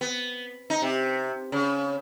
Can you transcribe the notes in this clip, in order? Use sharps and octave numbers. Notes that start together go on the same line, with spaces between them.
B3
D#4
C3
C#3